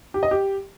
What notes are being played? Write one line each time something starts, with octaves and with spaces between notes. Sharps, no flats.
G4
D#5
G4